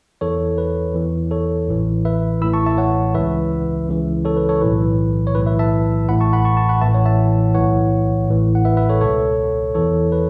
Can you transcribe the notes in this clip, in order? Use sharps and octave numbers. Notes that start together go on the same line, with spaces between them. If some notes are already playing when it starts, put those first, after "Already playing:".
E2 E3 A4 C#5
B4
E2 E3
A4 C#5
A1 A2 E3
B4 E5
A1 A2 E3 B5 E6
A5 C#6
E5 A5
C#5 F#5
C#2 C#3 E3 B4 E5
C#2 C#3 E3
A4 C#5
B4
A4 C#5
B1 A2 E3 B4
C#5
B1 A2 E3 B4
B4 E5
E5 A5
A1 A2 E3 F#5 B5
A5 C#6
F#5 B5
A5 C#6
A5 C#6
F#5 B5
A1 A2 E3 E5 A5
C#5 F#5
E5 A5
B1 A2 E3 C#5 F#5
A1 A2 E3
F#5
B4 E5
B4 E5
A4 C#5
C#2 B2 A4 C#5
E2 E3 A4 C#5
B4